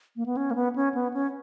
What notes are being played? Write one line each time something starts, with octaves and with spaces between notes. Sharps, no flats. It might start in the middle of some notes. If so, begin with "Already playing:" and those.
A#3
B3
C#4
A#3
B3
C#4
B3
C#4